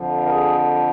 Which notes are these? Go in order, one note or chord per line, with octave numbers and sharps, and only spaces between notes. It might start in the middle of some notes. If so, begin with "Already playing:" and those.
Already playing: F2 D3 F3
A#4
G#4